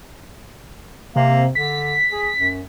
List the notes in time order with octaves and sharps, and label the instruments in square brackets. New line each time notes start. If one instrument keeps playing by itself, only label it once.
[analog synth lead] C3 [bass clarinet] A#3
[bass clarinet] D3 [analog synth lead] B6
[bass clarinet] G#4
F#2